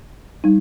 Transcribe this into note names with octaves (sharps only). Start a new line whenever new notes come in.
G3 D#4